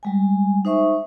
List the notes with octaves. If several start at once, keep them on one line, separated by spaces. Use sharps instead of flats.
G3 G#3 G#5
D#4 C5 E5 C#6